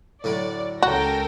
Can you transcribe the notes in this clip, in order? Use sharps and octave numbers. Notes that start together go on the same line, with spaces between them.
A2 D3 F#3 D5
C#2 C#4 F#4 A4 A#4 G5 A#6